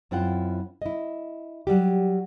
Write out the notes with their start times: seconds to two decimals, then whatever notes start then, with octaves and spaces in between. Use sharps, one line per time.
0.11 F#2 C4 E4 F4 F#5 G5
0.82 E4 D#5
1.67 F#3 G3 G4